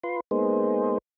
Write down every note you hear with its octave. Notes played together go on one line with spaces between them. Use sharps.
F4 B4 C6
G#3 A#3 B3 D#4 G#4 C5